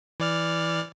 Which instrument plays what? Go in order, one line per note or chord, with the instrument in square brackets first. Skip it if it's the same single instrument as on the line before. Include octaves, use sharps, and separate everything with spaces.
[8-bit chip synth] E3 D5 F6